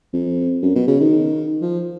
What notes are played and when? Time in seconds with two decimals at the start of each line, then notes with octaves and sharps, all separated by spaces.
0.14 F2
0.63 F#2
0.76 B2
0.88 C#3
1.01 D#3
1.62 F3